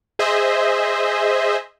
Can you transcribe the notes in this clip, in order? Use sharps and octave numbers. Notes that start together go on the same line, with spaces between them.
G#4 C5 D#5 E5